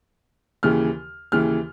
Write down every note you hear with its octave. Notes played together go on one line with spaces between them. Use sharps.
D#2 C#3 E3 F6
D#2 C#3 E3 F6